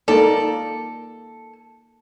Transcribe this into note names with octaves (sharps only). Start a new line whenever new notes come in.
A#3 D#4 A4 D5